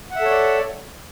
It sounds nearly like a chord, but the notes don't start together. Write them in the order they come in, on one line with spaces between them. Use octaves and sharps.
F#5 E5 A4 C#5 D5